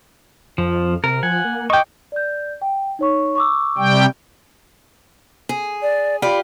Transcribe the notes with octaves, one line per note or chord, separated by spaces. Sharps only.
F2 F3
C3 A#4
F3 F#5 G#5
A#3
D#5 G5 C#6 D6
D5 G6
G5
D#4 C#5 C#6
C#6 D6 E6
C3 G3 G5
G#4
D5
F4 G4 D5 B5